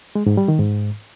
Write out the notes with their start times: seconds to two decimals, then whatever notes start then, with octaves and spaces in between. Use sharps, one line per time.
0.15 G#3
0.26 G#2
0.37 G3
0.48 D#3
0.59 G#2